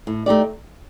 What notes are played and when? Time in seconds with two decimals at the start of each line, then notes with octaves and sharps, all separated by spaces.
0.07 A2
0.26 A3 D#4 G4 D5